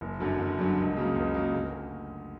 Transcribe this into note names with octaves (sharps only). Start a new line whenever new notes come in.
F#1
F#2 D3 F#3
F#1
F#2 D3 F#3
C#2
C#3 F#3 A#3
C#2
C#3 F#3 A#3
D2